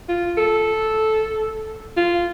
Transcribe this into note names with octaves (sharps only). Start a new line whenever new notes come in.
F4
A4
F4